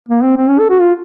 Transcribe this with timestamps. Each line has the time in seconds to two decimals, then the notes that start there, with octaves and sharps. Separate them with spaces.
0.08 A#3
0.23 C4
0.37 C4
0.48 C#4
0.59 A4
0.70 F#4
0.81 F4